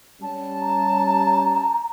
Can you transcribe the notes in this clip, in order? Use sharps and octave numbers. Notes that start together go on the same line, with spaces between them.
G3 C#4 A5
A#5